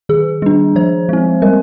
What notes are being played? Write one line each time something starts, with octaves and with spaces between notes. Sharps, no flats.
D#3 G#4
G3 D4
F3 C5
G#3 C4
G3 A#4